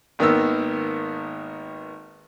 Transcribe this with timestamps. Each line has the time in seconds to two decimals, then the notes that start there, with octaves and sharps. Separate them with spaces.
0.19 G#1 D#3 A#3 B3 E6